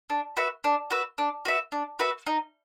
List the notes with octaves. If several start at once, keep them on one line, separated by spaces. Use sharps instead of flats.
D4
F#4 B4 E5
D4
F#4 B4 E5
D4
F#4 B4 E5
D4
F#4 B4 E5
D#4